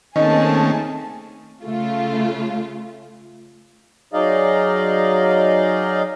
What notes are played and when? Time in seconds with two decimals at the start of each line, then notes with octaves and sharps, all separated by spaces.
0.16 D#3 A3 A#3 C4 C#4 G#4 D#5 A5
1.64 C#3 A3 F4
4.13 F#3 D#4 G#4 D5 D#5 F5